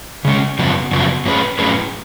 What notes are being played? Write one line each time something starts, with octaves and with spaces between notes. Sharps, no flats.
C#3 G#3 C#4
F#2 C#3 F3 B3 F#4
F#2 C#3 F3 B3 F#4
A2 F#3 C#4 G#4 B4
A2 F#3 C#4 G#4 B4